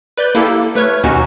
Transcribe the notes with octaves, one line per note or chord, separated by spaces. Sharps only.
B4 D5 F#6 G6
A#3 E4 G4 A4
A3 B4 C#5 C#6 F6
D#2 B2 C#4 D#4 F#4